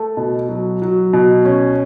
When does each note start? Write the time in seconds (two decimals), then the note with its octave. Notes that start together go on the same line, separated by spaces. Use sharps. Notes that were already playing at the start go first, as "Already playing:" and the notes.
Already playing: A3
0.17 B2
0.49 F#3
0.82 F#3
1.13 B2
1.45 C#4